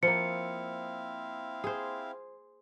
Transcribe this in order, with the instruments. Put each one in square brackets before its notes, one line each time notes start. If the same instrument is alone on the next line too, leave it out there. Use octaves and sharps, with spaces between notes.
[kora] F3 A#3 [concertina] C4 E4 F5 [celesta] C#7
[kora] G#4 C5